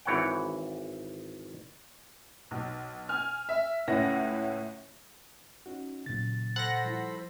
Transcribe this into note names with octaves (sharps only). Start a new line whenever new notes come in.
G#1 E3 C#5 F#5 G5
B1
G#5 F6
E5
C#2 A2 C#4 E4 F#5 A#6
C#4 D#4 F#4
A#2 C#3 F#3 A6
A4 C5 F#5 B5 A#6
F3 G3 E4